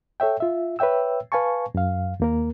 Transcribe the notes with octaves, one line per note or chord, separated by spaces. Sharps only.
A4 C#5 E5 G5
F4 E5
B4 C#5 E5 G5 E6
B4 F5 G#5 A5 C#6
F#2 F5
D#2 A#3 A#4